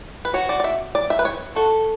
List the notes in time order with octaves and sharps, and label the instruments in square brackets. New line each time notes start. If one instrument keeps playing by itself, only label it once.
[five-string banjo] B4
[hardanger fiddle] F#4 [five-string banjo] C#5
[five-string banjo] D5
D5
E5
D5
E5
B4
C#5
[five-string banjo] F#4 [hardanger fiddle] A4